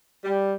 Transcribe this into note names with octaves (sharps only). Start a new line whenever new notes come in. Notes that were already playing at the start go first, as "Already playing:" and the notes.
G3